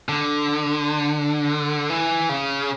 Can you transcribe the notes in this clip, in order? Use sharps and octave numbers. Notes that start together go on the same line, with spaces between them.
D3
E3
C#3